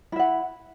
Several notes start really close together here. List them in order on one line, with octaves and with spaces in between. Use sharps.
E4 E5 F#5